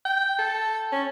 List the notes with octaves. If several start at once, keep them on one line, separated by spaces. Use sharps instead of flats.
G5
A4
C#4